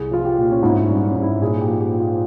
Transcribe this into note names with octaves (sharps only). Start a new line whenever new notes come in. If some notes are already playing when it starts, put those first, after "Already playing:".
Already playing: C2 G#4
F3 F4
G4
A#2
C#4
G#2 E4
C#4
G3
C#4
G#2
E4
A#2 G#4
G4
F3
G4
F3
F4